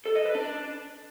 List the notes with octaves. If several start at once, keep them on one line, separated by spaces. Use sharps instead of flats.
A4
D#5
B4
D4